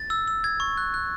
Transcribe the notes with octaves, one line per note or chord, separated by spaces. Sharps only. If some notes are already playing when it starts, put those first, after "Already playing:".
Already playing: A6
E6
E6
G#6
C#6
F#6
F#6